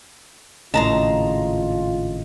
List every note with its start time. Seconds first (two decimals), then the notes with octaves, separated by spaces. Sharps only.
0.74 G#1 A2 C#3 F4 D#5 A5 A#5 C6